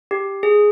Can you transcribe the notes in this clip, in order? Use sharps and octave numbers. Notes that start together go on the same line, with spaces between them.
G4
G#4